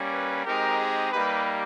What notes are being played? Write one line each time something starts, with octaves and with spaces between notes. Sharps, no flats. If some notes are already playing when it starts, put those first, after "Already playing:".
Already playing: G3 A#3 C#4
B4
G#3 C4 D#4 G4 A#4
G#4
G3 A#3 D#4 G4 B4